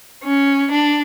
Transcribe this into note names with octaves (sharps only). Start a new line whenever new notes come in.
C#4
D4